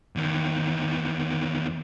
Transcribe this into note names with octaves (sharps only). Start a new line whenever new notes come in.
E2 D#3